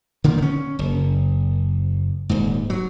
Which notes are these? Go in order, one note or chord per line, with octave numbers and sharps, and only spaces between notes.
D3 D#3 A#3
B3 C#4
F#1
D#1 G#2
F#3